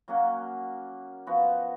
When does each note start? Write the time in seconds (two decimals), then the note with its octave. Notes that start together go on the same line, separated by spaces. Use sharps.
0.08 F#3 A#3 C#4 F#4
1.27 F3 B3 F#4